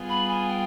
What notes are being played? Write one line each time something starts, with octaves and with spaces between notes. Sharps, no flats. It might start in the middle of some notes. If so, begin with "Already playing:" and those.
Already playing: G3 B3 F4 G#4
B5
G#5
G5